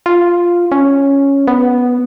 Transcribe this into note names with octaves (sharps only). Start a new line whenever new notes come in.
F4
C#4
B3